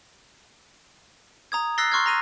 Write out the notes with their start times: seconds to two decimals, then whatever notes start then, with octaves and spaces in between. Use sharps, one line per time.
1.52 A#5 D#6 G#6
1.78 E6 F#6 A6 A#6 C7 G7
1.92 C6 C#6 F6 F#6 G#6
2.06 A#5 A#6 D#7 F7